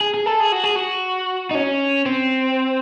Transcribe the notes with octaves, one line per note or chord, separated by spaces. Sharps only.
G#4
G#4
A4
G#4
F#4
G#4
F#4
D#4
C#4
C4